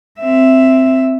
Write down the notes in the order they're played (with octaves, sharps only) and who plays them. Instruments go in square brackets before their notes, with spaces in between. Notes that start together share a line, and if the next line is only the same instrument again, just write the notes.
[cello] C4 E5